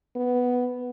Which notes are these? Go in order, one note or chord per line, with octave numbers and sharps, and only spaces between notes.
B3